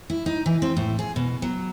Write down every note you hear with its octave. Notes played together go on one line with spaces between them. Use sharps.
E4
D#4
E3
C4
A2
G#4
B2
F#3